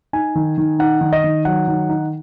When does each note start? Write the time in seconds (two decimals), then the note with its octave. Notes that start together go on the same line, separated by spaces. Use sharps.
0.13 D#4 G#5
0.35 D#3
0.58 D#3
0.79 D#4 F#5
1.01 D#3
1.13 D#5
1.24 D#3
1.45 F#3 F#5
1.68 D#3
1.89 D#4